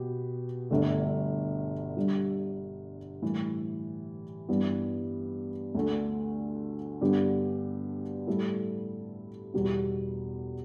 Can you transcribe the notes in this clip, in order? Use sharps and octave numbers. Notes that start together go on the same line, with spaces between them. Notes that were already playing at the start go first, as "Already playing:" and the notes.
Already playing: B2 B3 G4
G1 G2 D3 A3
G2 D3 G3
A2 E3 G3
G2 E3 G3 B3
D2 D3 A3
G2 D3 B3 G4
A2 G3 E4 A4
E2 B2 G3 B3 G4